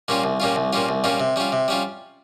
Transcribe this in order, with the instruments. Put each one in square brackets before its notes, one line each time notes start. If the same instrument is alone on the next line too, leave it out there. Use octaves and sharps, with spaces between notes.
[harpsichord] A#2 G3 C#4 F4
C2
A#2 G3 C#4 F4
C2
A#2 G3 C#4 F4
C2
A#2 G3 C#4 F4
C3
G3 C#4 F4
C3
G3 C#4 F4